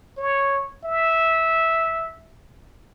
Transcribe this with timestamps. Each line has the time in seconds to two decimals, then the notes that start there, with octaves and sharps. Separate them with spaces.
0.17 C#5
0.84 E5